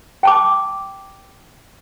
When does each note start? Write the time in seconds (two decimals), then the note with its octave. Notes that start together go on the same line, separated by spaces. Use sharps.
0.23 G5 A5 D6